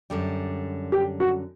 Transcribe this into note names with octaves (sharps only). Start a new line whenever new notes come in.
F#2 D3 G3
G4
F#4